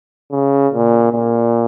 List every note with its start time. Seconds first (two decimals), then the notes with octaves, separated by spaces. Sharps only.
0.32 C#3
0.73 A#2
1.12 A#2